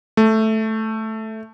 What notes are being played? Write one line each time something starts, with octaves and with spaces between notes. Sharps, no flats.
A3